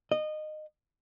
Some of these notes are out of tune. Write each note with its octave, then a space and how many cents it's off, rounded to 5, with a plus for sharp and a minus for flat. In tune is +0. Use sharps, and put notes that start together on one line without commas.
D#5 -20